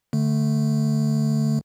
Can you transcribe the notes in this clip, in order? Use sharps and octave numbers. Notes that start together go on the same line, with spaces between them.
D3 A3